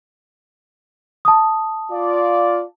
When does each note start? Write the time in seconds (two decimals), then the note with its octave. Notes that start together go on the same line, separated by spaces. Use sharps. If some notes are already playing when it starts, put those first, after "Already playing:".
1.25 A5 D#6
1.92 F4 D5